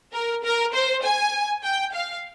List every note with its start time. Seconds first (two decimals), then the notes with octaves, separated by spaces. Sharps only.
0.13 A#4
0.44 A#4
0.73 C5
1.04 G#5
1.64 G5
1.94 F5